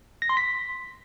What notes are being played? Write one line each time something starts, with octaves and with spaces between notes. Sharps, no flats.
A#6
C6
B6